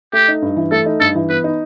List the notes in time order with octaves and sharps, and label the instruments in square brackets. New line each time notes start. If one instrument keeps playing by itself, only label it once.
[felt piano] A3 [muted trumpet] G4
[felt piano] D#4
G2
E3
[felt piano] A3 [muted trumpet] A4
[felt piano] D#4
[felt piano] G2 [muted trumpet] A4
[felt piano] E3
[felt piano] B3 [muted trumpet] B4
[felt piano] D#4